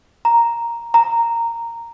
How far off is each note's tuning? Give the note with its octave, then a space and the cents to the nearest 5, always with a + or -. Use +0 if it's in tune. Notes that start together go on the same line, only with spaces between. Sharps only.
A#5 +0
A#5 -10